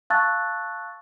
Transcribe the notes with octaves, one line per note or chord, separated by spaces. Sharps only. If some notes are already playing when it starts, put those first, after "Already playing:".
F5 A5 C#6 E6 F#6 A6